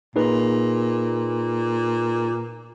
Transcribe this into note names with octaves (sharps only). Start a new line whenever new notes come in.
A#2 D#4 G#4 B4